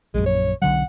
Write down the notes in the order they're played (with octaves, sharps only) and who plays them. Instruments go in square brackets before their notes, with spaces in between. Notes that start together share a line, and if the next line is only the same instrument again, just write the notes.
[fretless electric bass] A#1 F#2 [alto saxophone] G#3
[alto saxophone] C#5
[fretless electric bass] B1 D3 F#3 [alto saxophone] F#5